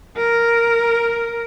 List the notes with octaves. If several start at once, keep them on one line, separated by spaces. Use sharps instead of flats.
A#4